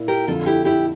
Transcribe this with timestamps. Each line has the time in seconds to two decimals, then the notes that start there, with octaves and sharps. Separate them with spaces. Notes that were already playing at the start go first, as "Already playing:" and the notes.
Already playing: A#2 E4
0.08 G4 A#4
0.27 F2 D3 F3 F4 A4
0.46 E4 G4
0.65 E4 G4